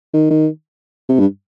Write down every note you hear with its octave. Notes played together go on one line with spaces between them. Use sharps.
D#3
D#3
C3
G2